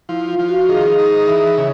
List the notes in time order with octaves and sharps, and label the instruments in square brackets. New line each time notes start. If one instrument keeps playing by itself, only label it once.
[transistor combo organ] F3 [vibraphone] E4
[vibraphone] F4
[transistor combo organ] F3
[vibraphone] F#4
[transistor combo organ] D#3 [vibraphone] G#4
[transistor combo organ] D#4
E3
C#3